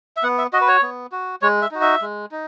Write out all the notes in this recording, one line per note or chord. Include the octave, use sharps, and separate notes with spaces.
E5
B3 F#5
E5
F#4 D#5
B4
C#5
B3
F#4
G#3 C#5
E5
D#4 F#4
E5
G#3
D#4